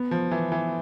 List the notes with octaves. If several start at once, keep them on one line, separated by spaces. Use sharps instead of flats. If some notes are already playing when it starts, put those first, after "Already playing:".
Already playing: B3
F3
E3
E3